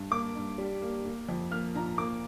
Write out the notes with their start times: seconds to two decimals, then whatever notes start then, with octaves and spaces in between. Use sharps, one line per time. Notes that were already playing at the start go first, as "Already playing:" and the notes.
Already playing: G2
0.11 A#3 D6
0.36 G2
0.58 G3
0.82 A#3
1.05 A#3
1.29 F2
1.51 A#3 F6
1.75 A#2 A#5
1.98 A#3 D6